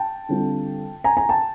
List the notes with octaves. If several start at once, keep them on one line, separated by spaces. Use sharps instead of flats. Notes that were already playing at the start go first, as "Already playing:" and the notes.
Already playing: G5 A5
D3 G3 C4 F4
G#5 A#5
G#5 A#5
G5 A5